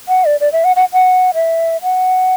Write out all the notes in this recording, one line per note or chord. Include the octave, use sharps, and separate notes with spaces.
F#5
D5
D5
E5
F#5
F#5
F#5
E5
F#5